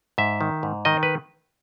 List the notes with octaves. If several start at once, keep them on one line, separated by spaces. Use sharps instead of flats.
G#2 E5
D#3
G#2
D#3 D#5
B4